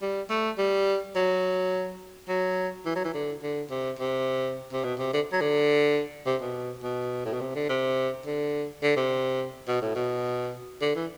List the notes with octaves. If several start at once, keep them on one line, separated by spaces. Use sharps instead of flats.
G3
A3
G3
F#3
F#3
E3
F#3
E3
D3
D3
C3
C3
C3
B2
C3
D3
F#3
D3
C3
B2
B2
A2
B2
C3
D3
C3
D3
D3
C3
B2
A2
B2
D3
E3